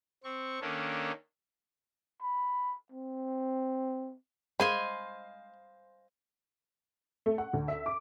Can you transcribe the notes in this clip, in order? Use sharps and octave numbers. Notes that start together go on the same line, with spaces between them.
C4 C#6
D#3 A#3 C#4 D4 A4
B5
C4
G#3 C5 D#5 F5 G#5 B5 C6
A3
F#5
D2
E5
D6